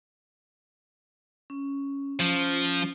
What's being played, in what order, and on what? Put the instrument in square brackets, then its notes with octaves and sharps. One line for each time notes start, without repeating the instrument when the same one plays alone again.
[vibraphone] C#4
[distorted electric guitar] F3 [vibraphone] C#4